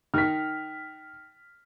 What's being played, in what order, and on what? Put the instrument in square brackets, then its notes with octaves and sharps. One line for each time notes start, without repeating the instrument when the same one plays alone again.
[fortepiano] D#3 [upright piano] F6 B6